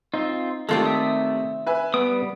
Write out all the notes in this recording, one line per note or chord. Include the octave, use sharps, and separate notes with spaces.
C4 D#4 F4
C3 D#3 G#3 A3 C4 F4 A4 D5
E5 D#6
B4 E5 G#5
G3 B3 D#6 D7